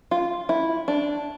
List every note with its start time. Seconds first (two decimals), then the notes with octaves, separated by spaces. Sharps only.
0.11 F4
0.49 E4
0.88 D4